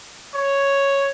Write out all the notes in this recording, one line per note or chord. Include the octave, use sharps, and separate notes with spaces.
C#5